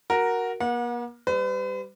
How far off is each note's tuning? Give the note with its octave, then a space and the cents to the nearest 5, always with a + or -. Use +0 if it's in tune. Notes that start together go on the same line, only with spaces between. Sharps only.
F#4 +0 A#4 +0
A#3 +45 F#5 -35
G3 +0 B4 +45